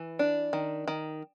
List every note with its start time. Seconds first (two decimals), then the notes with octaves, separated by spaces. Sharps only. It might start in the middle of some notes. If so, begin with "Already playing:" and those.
Already playing: E3
0.19 D4
0.53 D#3
0.88 D#3